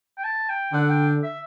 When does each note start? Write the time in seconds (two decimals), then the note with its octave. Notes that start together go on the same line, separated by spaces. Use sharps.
0.17 G5
0.24 A5
0.49 G5
0.74 D3 F#5
0.90 G5
1.23 E5